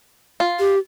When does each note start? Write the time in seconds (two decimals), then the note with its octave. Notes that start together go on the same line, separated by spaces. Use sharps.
0.40 F4
0.60 G4